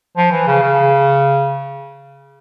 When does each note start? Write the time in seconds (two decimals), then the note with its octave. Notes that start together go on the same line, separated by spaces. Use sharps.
0.17 F3
0.31 E3
0.47 C#3
0.62 C#3